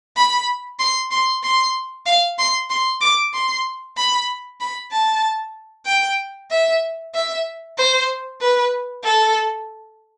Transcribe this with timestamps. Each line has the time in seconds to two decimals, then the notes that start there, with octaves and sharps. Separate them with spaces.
0.16 B5
0.79 C6
1.11 C6
1.43 C6
2.06 F5
2.38 C6
2.70 C6
3.01 D6
3.34 C6
3.97 B5
4.61 B5
4.92 A5
5.86 G5
6.51 E5
7.15 E5
7.78 C5
8.41 B4
9.04 A4